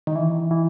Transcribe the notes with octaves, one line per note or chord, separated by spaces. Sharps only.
D#3
E3
E3